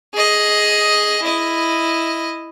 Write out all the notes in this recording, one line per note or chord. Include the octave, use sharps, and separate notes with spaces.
G#4 D#5
E4 D#5